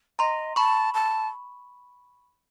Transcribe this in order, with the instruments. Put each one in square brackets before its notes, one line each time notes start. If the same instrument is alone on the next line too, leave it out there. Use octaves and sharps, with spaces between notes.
[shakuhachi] D#5 [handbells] A#5 C6
[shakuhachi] A5 [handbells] B5 C#6
[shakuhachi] A5